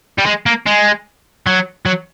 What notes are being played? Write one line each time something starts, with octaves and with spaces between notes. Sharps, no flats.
G3
G#3
A#3
G#3
F#3
F#3